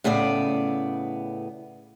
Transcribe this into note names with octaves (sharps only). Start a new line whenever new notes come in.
A2 C#3 B3 D5